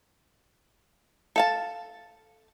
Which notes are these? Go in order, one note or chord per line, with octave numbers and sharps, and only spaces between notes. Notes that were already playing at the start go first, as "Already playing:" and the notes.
A4 F5 A5